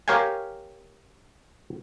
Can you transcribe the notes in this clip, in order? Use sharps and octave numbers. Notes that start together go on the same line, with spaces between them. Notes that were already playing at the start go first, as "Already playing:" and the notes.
G4 A#4 C#5 F5 G5 G#5